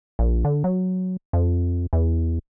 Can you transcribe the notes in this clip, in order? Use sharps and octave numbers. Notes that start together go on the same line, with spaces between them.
A#1
D3
F#3
F2
E2